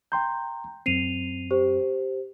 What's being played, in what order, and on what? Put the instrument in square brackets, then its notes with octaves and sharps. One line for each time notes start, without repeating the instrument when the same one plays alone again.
[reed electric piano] G5 C6 G6 [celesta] A#5
[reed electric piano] F#2 C4 [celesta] C7 D#7 F7
[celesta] G4 C5